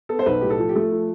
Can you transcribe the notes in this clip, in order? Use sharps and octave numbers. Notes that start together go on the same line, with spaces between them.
B3 A4
C5
B1 B4
A2 G4
A4
F3
G4
A3 A4
F3